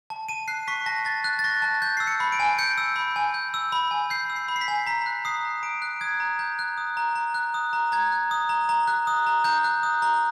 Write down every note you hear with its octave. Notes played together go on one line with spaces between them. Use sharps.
A5
A5 D#7
F#6 C7
C#6 B6
A5 A#6
A5 A6
F#6
A6
C#6 A#6
A5
G6
E6 C7
C#7
B5
D7
G#5
G6 C#7
E6
B5
G#5
G6
E6
B5
G#5
G6 C7
E6
C7
B5
C7
B6
G#5
A#5 B6
F#6
D#6 C7
A#5
A#5 D7
F#6
D#6 G#6
A#5
A#5 G6
F#6
D#6
A#5
A#5
F#6
D#6
A#5
A#5 G#6
F#6
D#6
A#5
A#5
F#6
D#6
A#5
A#5 G6
F#6
D#6
A#5